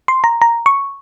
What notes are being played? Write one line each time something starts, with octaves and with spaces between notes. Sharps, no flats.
C6
A#5
A#5
C#6